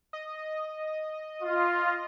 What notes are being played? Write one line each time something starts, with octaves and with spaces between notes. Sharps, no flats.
D#5
F4